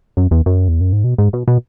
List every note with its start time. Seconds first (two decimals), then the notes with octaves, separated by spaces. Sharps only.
0.17 F#2
0.31 E2
0.46 F#2
0.69 E2
0.81 F#2
0.92 G#2
1.04 B2
1.18 G#2
1.33 B2
1.48 B2